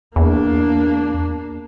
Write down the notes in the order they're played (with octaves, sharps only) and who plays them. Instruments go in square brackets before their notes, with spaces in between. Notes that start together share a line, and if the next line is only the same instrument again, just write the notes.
[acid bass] E2 [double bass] A#3 D4